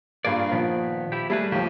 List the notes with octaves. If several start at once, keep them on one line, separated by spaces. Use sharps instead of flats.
G2 A#3 F4 G#4 D5
A#2 D#3 F3 B3
E4 G4
G3 A3 E4 G#4 B4
D#2 F3 G4